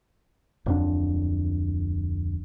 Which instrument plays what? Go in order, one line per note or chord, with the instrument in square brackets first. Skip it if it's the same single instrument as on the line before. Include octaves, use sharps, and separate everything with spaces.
[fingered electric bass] D1 F2 D4